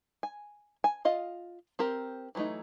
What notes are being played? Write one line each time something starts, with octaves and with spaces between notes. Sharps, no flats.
G#5
G#5
F4 D#5 F5
C4 G4 A#4
E3 F#3 G3 A3 D#4